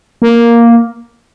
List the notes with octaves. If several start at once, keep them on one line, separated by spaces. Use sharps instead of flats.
A#3